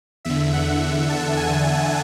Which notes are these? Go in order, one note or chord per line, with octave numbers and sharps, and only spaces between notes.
E2 D3 E5
F#5
A5
G#5